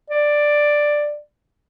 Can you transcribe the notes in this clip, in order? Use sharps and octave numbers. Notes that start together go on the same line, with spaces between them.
D5